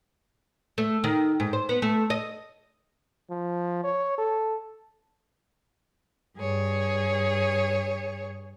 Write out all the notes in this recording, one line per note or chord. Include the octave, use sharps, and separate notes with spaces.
A3
D#3
G#2
C5
B3
A3
D#5
F3
C#5
A4
G2 G#4 C#5